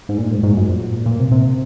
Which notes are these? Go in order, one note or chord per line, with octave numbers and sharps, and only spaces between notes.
G#2
A#2
G#2
G#2
F#2
A#2
A#2
C3
C3